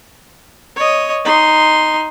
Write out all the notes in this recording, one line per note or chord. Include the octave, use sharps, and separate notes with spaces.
C#5 D#5
D#4 C6